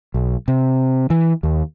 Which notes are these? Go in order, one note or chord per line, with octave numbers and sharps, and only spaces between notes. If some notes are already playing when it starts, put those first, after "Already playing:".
B1
C3
E3
D#2